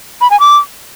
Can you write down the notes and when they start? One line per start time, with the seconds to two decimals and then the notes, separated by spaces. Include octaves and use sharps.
0.21 B5
0.30 G#5
0.40 D6